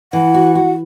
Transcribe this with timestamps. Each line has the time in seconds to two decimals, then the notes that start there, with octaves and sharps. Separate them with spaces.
0.13 E3 F#5
0.34 F#4
0.55 F#4